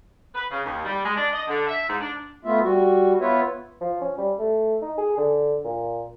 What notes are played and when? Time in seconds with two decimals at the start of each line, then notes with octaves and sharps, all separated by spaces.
0.35 B4
0.51 C#3
0.65 D#2
0.85 G3
1.05 G#3
1.17 D4
1.33 D#5
1.47 D3
1.68 E5
1.89 G#2
2.01 D4
2.45 A3 B3 F4 E5
2.62 G3 F#4
3.21 B3 F4 B4 C#5 E5
3.81 F3
4.01 C#4
4.17 G3
4.39 A3
4.82 D#4
4.97 G#4
5.17 D3
5.64 A#2